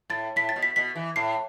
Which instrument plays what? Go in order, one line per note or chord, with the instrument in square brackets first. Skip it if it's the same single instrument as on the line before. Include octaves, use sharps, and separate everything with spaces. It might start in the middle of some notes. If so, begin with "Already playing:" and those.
[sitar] A2 [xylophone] A6
[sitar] A2 [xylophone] B6
[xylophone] A6
[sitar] B2
[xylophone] B6
[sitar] B2 [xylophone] B6
[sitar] E3
[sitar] A2 [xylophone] C7